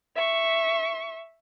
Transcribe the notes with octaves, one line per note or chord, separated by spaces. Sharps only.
E5 C#6